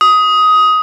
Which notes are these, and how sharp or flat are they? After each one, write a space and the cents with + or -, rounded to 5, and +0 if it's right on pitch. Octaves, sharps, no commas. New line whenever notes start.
D#6 +15